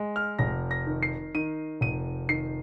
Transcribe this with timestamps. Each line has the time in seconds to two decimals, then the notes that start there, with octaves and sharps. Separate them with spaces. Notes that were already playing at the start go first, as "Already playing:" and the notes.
Already playing: G#3
0.16 F6
0.39 F1 A#6
0.71 A#6
0.87 D#3
1.03 C7
1.35 D#3 D#7
1.81 F1 D#7
2.29 D#3 C7